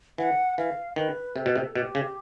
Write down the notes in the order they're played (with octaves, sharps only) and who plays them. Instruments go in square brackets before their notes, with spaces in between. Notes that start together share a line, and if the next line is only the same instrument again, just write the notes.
[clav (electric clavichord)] E3 [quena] F#5
[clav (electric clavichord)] E3 [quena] F5
[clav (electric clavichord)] D#3 [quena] B4
[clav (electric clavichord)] C3 [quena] A4
[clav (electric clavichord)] B2
C3
[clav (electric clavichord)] B2 [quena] G4
[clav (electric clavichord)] C#3